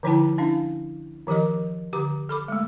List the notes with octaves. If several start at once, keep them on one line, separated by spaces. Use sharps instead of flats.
D3 F3 D#4 E4 G5 A5
C#4 D4 E4 F5
D#3 F3 G4 A#4 D#5
D3 G4 D6
A4 B5 D6
G#3 A3